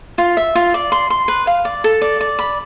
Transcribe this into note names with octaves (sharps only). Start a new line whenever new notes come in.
F4
E5
F4
D5
C6
C6
B4
F5
D5
A4
D5
D5
B5